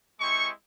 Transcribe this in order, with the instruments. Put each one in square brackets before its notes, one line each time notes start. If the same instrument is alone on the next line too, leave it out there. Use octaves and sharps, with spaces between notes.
[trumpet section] G#3 C4 E4 G4 C#6